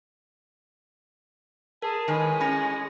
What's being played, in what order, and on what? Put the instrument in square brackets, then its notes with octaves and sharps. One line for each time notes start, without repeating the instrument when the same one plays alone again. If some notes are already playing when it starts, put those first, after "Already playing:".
[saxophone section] G#4 [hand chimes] A#4 [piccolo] A5
[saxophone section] A2 G#3 [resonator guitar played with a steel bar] D#3 B4 [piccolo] G#5
[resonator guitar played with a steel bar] C#4 [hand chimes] B5 A#6